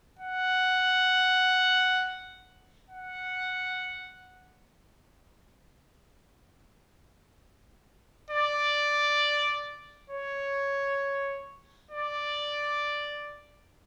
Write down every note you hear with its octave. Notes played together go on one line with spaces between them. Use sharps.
F#5
F#5
D5
C#5
D5